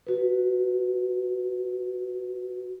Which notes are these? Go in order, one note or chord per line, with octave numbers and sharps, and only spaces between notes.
F#4 B4